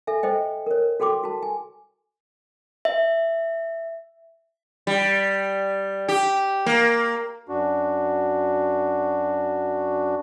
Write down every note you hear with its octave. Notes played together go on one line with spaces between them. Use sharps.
A4 E5 G#5
A4 C5 D#5 G5
A#4 C#5
F#4 A4 G5 C6 D6
F#4 A5
G#5
E5
G3
G4
A#3
F#2 D4 F#4